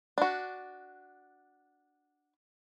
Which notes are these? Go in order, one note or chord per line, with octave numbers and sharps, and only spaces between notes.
D4 F#4